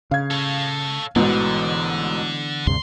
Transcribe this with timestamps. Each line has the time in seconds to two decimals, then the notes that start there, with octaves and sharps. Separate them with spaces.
0.11 C#3 F5 G#6
0.31 A4 C#5
1.16 A1 G#2 B2 D3 E3 B3
2.67 D2 G2 C3 C6